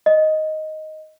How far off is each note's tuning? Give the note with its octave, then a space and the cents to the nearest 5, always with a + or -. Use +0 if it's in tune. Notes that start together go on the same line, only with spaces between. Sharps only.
D#5 +5